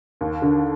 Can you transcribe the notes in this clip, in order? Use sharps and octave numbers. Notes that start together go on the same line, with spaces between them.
D#2
D3